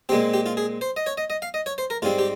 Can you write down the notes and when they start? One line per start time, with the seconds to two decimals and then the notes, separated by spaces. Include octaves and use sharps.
0.09 A#2 G#3 C4 G4
0.34 G4
0.46 F4
0.57 G#4
0.81 C5
0.97 D#5
1.06 C#5
1.18 D#5
1.30 D#5
1.42 F5
1.54 D#5
1.66 C#5
1.78 C5
1.90 A#4
2.02 G#2 G3 C4 F4
2.19 G4